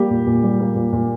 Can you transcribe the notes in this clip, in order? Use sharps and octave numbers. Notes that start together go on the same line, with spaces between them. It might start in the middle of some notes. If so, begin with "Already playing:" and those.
Already playing: G3 A#3 G4
A#2
A#2
G3
A#3
A#2
A#2